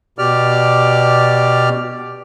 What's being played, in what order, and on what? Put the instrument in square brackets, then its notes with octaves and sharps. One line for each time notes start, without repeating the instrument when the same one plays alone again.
[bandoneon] B2 G4 D5 F6